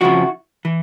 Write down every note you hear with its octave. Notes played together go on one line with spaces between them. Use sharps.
F2 C#3 F3 E4 F#4
E3